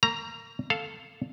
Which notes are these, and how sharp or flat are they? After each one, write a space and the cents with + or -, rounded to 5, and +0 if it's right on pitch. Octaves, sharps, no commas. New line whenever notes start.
A#3 -45 A#5 +0
A4 +0 F5 +0